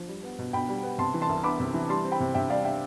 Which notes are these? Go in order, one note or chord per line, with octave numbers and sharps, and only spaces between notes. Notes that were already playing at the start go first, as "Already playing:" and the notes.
Already playing: F3
G3
B3
B2
B2 G5 B5
G3
B3
C3 A5 C6
E3
A5 C6
C2
B3 B5 D6
C3
E3
G3 A5 C6
C4
G5 B5
C3
C3 E5 G5
G3 D5 F5
C4 E5 G5